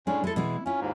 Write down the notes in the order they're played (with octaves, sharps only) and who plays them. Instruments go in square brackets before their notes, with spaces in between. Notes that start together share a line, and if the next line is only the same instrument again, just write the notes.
[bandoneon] A2 C#4 [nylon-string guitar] G#3 D4
[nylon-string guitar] G#3 A4 [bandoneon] E4
[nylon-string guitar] B2 E3 G#3
[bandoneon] C#4 [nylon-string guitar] E4 F4
[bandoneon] D#2 G#2